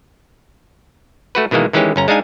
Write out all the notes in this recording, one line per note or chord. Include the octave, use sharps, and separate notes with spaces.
A3 F#4 B4
B2 D#3 E3 G#3 A#3
D#3 E3 G#3 C#4 G4
G1 C#4 A#5
G#3 D4 D#4 F5 G#5